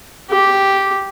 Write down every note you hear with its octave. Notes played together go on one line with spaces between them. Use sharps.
G4